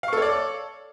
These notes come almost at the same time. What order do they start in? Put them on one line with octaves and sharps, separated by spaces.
F5 C#6 A4 C#5 D5